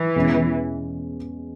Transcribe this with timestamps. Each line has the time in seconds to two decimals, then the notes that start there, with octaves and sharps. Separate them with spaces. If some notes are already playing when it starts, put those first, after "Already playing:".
Already playing: E3
0.16 E2 B2 G#3 C#4